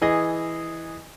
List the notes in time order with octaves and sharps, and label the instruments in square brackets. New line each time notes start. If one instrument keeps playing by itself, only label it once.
[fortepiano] E3 G#4 D#5